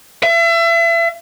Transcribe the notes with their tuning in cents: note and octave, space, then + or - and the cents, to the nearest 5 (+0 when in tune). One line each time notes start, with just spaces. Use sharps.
E5 +35